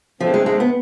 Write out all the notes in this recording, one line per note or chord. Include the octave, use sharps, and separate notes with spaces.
E2 D3 F3 A3 C4
G#3
G#3
B3